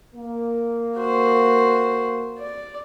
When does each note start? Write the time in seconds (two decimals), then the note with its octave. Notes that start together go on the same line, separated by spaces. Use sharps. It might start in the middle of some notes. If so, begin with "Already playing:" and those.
0.15 A#3
0.96 F#4 C5
2.38 D5